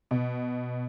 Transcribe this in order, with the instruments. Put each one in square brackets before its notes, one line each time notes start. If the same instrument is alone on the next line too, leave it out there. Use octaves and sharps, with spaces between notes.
[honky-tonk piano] B2